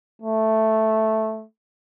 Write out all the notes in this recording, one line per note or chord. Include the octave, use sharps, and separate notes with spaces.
A3